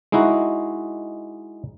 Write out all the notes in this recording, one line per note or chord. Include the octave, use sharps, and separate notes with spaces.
G#3 D#4 E4 F#4